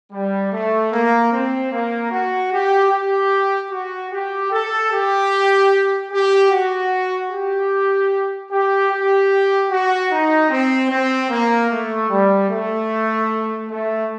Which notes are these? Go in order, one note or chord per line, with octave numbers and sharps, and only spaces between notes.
G3
A3
A#3
C4
A#3
F#4
G4
G4
F#4
G4
A4
G4
G4
F#4
G4
G4
G4
F#4
D#4
C4
C4
A#3
A3
G3
A3
A3